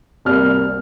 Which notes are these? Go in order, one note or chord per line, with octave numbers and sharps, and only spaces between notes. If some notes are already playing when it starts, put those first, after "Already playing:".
C2 C3 G3 A#3 F6